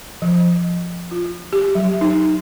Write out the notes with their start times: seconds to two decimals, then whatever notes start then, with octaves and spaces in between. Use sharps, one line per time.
0.22 F3
1.11 F4
1.53 G4
1.75 F#3
2.01 D#4